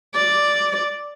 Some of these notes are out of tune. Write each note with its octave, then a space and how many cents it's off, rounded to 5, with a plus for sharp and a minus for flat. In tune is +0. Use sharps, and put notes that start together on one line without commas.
D5 +0